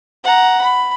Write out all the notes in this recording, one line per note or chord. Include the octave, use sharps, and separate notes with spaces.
F#5 A#5
B5